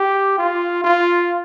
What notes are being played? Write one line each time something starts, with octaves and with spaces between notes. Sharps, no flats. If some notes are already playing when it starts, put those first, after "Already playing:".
Already playing: G4
F4
F4